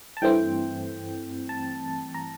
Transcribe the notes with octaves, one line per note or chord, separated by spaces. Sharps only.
A5
G2 E3 A3 C4 G5
A5
A#5